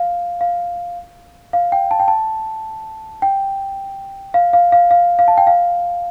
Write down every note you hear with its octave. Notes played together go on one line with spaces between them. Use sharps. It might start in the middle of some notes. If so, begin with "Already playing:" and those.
Already playing: F5
F5
F5
G5
A5
G5
A5
G5
F5
F5
F5
F5
F5
A5
G5
F5